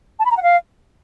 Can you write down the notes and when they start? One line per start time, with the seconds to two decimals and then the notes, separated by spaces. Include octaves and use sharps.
0.19 A5
0.25 B5
0.31 A#5
0.37 F#5
0.42 F5